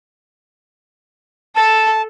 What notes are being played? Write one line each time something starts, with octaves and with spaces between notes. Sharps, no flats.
A4 A5